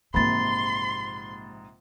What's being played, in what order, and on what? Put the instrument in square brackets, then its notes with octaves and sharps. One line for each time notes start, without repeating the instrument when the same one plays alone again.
[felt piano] A#1 G#2 C3 [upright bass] E3 A#3 [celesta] B5 A6 [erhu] C6